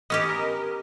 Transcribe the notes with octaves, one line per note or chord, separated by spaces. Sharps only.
B3 C#4 G4 D#5
A#4